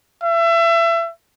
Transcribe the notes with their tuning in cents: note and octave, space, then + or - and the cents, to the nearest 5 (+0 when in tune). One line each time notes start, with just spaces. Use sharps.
E5 +30